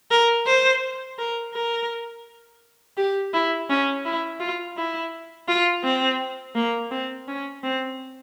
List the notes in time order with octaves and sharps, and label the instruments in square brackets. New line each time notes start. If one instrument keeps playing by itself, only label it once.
[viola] A#4
C5
A#4
A#4
G4
E4
C#4
E4
F4
E4
F4
C4
A#3
C4
C#4
C4